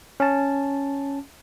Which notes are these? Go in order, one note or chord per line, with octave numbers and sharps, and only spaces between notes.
C#4 A5